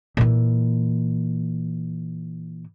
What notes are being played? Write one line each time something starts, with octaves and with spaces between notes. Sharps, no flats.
A#2 E3